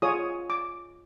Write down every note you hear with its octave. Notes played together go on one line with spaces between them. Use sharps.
F4 G#4 C#5 D#6
D6